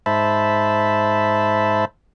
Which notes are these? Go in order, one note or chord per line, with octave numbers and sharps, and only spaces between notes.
G#2 C5 E5 A5 B5